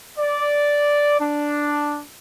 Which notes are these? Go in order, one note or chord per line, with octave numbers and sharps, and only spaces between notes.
D5
D4